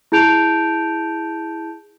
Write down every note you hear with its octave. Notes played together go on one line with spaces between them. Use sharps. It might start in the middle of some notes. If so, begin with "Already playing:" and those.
E4 G#4 A5 G6 D7 F7